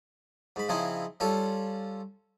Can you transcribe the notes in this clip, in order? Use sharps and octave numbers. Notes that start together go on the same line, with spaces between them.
G#2 B5
C#3 F3 C4 D#4 E4 G#4
G3 C#4 F4 A4